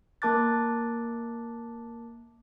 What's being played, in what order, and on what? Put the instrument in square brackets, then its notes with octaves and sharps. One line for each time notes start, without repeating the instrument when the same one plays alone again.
[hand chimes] A#3 A#4 A5 D6 F#6 A6